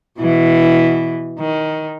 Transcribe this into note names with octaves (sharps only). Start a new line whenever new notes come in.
B2 E3
D#3